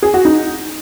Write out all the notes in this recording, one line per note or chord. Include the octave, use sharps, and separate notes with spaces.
G#4
F#4
D#4